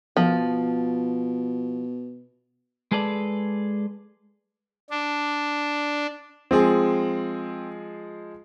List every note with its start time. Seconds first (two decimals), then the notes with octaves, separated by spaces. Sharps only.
0.17 B2 F3
2.92 G#3 G#4 A4 B4 D5
4.90 D4
6.51 F3 G#3 C4 G#4